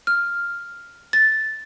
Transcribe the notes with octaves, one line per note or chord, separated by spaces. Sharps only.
F6
A6